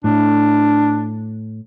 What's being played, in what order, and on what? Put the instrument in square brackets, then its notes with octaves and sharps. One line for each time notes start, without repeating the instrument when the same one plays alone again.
[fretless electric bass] A2 [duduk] D4